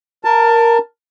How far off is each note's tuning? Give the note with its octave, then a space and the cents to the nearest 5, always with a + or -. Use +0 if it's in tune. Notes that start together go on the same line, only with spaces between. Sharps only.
A#4 +0 A5 +15